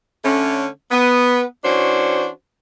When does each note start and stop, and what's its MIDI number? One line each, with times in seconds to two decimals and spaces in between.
0.24 0.66 50
0.24 0.66 57
0.24 0.66 61
0.90 1.42 59
1.64 2.28 52
1.64 2.28 61
1.64 2.28 62
1.64 2.28 66
1.64 2.28 72